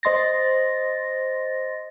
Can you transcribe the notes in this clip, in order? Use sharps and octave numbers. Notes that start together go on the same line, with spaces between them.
C5 D#5 C6 A6 A#6